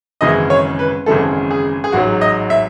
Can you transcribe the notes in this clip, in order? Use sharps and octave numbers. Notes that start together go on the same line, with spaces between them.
G#1 F#2 C#3 E3 G#3 D#5
C#5
B4
G#1 F#2 C#3 E3 G#3 A4
G#4
G#4
A1 G#2 F#3 F#4
D#5
E5